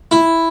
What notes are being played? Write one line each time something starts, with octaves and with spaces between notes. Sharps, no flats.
E4